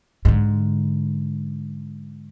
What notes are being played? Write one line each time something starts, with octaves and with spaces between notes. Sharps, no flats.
G#2 D3